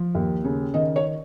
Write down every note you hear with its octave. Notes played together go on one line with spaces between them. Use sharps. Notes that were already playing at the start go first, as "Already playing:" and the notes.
Already playing: F3
D#2
C#3
D#3 D#5
C#5